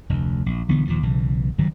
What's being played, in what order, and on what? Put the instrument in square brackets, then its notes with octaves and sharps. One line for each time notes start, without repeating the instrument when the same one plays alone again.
[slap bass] F1 D2
A#1
B1 D3 E3 B3
D#2 A#2 F3
B1 C#3 E3
F#1 G2 D#3 F#3